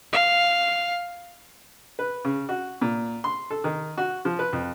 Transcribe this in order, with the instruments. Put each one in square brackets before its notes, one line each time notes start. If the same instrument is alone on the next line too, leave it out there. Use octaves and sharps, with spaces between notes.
[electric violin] F5
[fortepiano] B4
C#3
F#4
A#2
C6
A4
D#3
F#4
F3
B4
F2